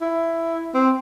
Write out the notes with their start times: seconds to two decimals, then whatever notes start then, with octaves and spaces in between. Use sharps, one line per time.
0.01 E4
0.74 C4